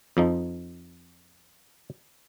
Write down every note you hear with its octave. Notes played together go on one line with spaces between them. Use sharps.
F2 F3 D#4